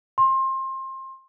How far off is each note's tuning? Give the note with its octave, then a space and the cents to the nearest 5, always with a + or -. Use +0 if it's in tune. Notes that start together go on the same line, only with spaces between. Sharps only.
C6 +25